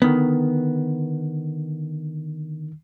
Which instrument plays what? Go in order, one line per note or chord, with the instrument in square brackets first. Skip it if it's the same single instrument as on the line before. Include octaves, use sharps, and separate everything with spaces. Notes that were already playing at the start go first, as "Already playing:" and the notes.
[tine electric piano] D3 D#3 [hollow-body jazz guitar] B3